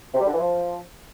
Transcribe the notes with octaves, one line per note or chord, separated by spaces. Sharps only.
C3
G3
D3
E3
F3